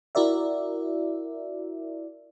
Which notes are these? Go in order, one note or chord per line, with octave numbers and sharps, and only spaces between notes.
E4 F#4 A#4 D5 E5